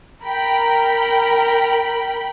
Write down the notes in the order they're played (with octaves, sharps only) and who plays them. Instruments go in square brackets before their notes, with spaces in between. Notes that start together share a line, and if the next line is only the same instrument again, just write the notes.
[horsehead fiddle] A#4 [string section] G5 B5